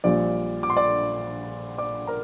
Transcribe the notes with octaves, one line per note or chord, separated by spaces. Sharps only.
A#1 A#2 G3 D5 D6
D6
C6
D5 D6
D5 D6
A#4 A#5